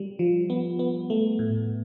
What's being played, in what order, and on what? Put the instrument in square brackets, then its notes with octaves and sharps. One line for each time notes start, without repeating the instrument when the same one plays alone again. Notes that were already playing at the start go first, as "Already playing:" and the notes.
Already playing: [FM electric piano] G3
F3
B3
B3
A3
A2